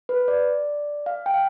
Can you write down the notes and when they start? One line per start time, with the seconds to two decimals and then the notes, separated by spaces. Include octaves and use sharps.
0.09 B4
0.28 D5
1.06 F5
1.26 G5
1.34 F5